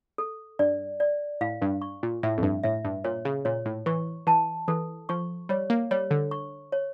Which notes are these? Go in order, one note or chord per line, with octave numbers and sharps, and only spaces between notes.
A4
G2 D5
D5
A2 F5
G2
C#6
A#2
A2 E5
F2
G2
A2 E5
G2
A#2 C#5
C#3
A#2 C#5
A2
E3 C#6
E3 A5
E3 A4
F3 C#6
G3 C#5
A#3
G3 C#5
D3
C#6
C#5